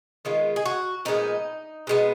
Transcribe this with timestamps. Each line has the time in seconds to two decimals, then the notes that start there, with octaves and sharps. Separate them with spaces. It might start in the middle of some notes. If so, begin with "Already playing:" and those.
0.25 D#3 G#3 B3 F4
0.56 G#4
0.66 F#4
1.05 A#2 F3 G#3 B3 D#4
1.87 B2 G#3 B3